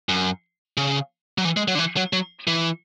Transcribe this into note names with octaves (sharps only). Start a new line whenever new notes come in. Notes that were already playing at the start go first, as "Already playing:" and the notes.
F#2
C#3
F#3
E3
G#3
F#3
D3
E3
F#3
F#3
E3